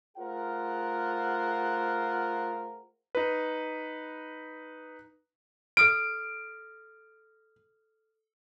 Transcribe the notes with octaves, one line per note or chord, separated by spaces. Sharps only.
A3 F4 G#4 A#4 C5 F#5
D#4 B4
A4 D#6 F6 D7